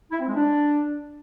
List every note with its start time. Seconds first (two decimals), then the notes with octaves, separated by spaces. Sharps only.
0.11 E4
0.19 C4
0.27 G#3
0.35 D4